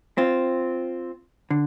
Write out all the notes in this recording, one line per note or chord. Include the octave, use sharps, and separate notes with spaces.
C4 F4
D3